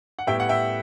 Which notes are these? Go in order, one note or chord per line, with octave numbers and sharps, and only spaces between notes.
F#5
A2 G3 B3 E4 E5 G5
F#5
E5 G5